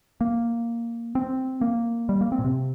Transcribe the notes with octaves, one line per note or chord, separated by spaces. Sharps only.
A#3
C4
A#3
G3
A#3
C4
A#2
C3